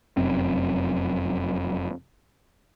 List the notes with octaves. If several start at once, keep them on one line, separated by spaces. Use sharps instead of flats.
F1 F#2 C4